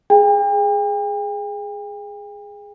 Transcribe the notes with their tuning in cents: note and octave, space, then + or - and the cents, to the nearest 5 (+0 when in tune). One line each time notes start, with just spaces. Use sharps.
G#4 +0 G5 +40